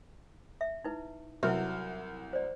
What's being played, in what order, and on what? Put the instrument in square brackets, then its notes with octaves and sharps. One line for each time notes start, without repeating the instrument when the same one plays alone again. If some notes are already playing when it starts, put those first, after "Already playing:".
[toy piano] E5
D#4 E4 B4
[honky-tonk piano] C2 F#3 F6 [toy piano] E4 B4 E5
[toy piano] C5 D5